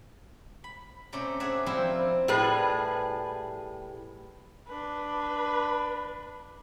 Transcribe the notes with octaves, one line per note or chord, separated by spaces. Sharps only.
B5
C3 A3 C#4 D5 A#5
C4 D4 G#4 D5 E5 F#5
F3 G3 C4 E4 A#4
A2 G3 G#4 B4
D4 B4